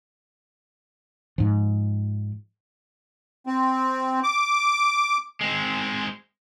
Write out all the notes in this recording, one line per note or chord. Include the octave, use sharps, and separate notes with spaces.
G#2 F3
C4
D6
G#3 C4